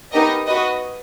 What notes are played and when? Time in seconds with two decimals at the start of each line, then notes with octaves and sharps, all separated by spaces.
0.12 B3 D#4 G4 A#4 D#5
0.48 F#4 B4 D#5